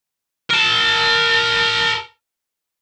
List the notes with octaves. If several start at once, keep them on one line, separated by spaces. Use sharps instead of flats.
A#4 A5